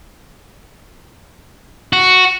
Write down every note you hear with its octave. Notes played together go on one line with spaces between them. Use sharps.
F#4